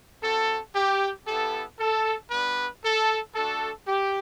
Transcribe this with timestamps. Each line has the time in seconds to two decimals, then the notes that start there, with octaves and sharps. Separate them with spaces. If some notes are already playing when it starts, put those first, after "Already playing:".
0.23 C4 F#4 A4
0.75 G4
1.26 B3 E4 G4 A4
1.79 A4
2.30 G3 B3 D4 B4
2.84 A4
3.35 A3 D4 F#4 A4
3.87 G4